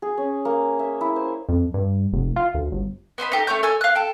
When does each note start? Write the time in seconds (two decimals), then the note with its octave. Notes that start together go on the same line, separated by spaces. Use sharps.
0.02 G#4
0.18 C#4
0.45 A#3
0.79 E5
1.01 E4
1.16 C5
1.49 F2
1.74 G2
2.13 F1
2.36 F4
2.54 D2
2.72 G1
3.18 B3 C5 D#5 B5
3.32 D#4 G4 A4
3.47 A3 C#4 C#5 G6
3.63 A4 C#5 G#5 E6
3.81 F5 F#6
3.95 A4 G5